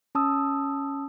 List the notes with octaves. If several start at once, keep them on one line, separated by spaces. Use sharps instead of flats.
C#4 A5 D#6 E6